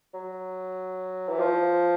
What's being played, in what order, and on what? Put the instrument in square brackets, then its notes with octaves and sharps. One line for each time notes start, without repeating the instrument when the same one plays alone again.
[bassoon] F#3
E3
F3